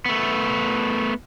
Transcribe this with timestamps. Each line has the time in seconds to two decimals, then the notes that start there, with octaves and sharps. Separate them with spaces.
0.06 A3 B3